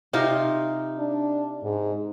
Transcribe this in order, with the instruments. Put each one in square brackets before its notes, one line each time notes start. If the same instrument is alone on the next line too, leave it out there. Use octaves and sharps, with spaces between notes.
[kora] C3 D#4 F4
[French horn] D4
G#2